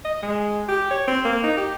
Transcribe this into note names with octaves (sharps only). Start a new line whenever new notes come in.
D#5
G#3
G4
C#5
C4
A#3
D#4
G4